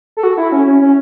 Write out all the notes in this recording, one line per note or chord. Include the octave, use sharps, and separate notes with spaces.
A4
F#4
E4
C#4
C#4
C#4